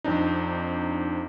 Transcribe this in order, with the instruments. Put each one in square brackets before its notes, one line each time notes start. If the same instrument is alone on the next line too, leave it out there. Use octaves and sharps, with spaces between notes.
[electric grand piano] F2 C4 D4 D#4